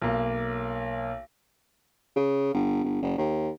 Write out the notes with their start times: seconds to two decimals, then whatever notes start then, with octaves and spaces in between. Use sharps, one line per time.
0.02 B1 A#3
2.16 C#3
2.54 G1
2.84 G1
3.02 F#1
3.18 D#2